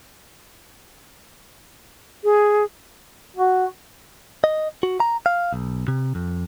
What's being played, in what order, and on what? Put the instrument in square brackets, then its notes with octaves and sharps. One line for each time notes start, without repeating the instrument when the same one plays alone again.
[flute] G#4
[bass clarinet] F#4
[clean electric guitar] D#5
F#4
A#5
F5
B1
C3
F2